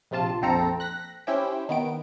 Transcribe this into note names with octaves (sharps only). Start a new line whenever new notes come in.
A#1 C3 F4 A5
A#1 F2 C4 A4 A#5
F#6 A#6 B6
C#4 E4 G4 C5 G5
D#3 B3 D7